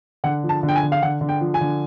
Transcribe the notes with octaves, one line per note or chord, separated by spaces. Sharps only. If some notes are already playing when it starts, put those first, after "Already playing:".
D3 F#5
F3
A5
D3
G5
G#5
D3
F5
D3 F#5
D3
G5
F3
G#5
D3